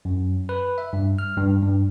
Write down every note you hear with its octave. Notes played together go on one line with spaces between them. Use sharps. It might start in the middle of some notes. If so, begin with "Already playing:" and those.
F#2
B4
E5
G2
F6
G2
G2